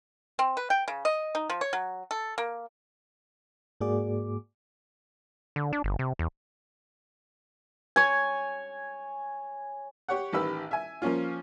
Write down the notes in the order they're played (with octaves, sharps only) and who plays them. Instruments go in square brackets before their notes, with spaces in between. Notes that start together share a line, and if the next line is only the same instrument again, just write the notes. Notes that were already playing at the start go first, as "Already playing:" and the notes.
[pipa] C4
B4
G5
C#3
D#5
D#4
F3
C#5
F#3
A4
A#3
[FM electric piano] G#2 A#3 F#4 G#4 D5 D6
[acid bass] D3
D4
G1
C3
E2
[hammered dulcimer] C#5 G#5
[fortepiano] G4 C#5 F#5
A1 D#3 G4 B4 E6
E5 G#5
F3 A#3 C#4 F4